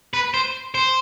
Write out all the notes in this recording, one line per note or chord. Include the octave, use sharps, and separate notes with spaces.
B4
C5
C5